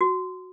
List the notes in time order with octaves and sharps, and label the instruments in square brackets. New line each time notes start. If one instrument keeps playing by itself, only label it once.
[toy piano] F#4